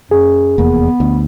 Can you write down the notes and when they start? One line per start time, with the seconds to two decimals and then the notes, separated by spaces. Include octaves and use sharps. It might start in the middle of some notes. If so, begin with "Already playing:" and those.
0.11 F#2 G#4
0.58 F1 E2 A#3 B3
1.00 D2